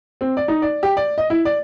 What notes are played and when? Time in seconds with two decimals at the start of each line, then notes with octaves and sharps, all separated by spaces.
0.21 C4
0.37 D5
0.48 D#4
0.62 D5
0.83 G4
0.97 D5
1.18 D#5
1.30 E4
1.45 D5